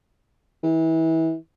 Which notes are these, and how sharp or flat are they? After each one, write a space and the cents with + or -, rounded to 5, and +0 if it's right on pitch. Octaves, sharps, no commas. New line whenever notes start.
E3 -30